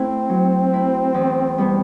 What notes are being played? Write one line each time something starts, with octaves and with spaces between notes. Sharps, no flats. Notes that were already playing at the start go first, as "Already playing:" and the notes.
Already playing: A3 C4 E4
F#3
A3 E4
E2
B2 G3 B3